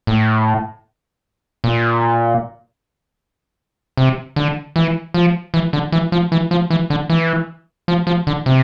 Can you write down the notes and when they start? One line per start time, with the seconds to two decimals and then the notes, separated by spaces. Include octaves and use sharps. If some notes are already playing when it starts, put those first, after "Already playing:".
0.07 A2
1.64 A#2
3.97 C3
4.36 D3
4.76 E3
5.14 F3
5.54 E3
5.73 D3
5.92 E3
6.12 F3
6.32 E3
6.51 F3
6.70 E3
6.90 D3
7.10 E3
7.88 F3
8.07 F3
8.27 D3
8.46 C3